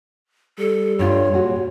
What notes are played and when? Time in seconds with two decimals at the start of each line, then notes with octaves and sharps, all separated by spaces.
0.59 G3 A4
0.99 G2 F4 C#5
1.34 A#2 F#4 G#4